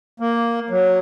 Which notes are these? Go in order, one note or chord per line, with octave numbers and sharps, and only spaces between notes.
A#3
F#3